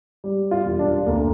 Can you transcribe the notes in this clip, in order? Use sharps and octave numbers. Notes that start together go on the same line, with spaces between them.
G3
F4
E1
D4
D2 A#3